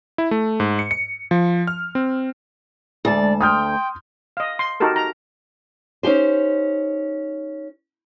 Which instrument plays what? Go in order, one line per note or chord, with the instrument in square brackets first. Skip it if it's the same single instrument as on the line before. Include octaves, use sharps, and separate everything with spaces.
[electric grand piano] E4
A3
G#2
C#7
C#7
F3
F6
C4
[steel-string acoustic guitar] D2 A5 [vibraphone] G#3 [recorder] D5
[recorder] G5 [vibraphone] C6 [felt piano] D#6 F6 G6
[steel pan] D#5 F5
C6
D#4 F#4 G4 A4 A#4
A#5
[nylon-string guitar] C#4 D#4 G4 C5